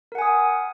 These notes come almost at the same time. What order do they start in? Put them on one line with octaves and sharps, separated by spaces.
A#4 F#5 G#5 D#6